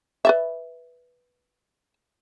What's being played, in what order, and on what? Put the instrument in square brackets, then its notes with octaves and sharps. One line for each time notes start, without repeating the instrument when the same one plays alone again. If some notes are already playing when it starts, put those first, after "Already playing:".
[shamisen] B4 D5 E5